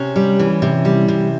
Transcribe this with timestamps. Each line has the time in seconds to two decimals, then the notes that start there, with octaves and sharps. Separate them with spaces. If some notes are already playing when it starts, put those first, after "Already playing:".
Already playing: C3 C#4
0.16 G3
0.39 E3
0.62 C3
0.85 G3
1.08 C3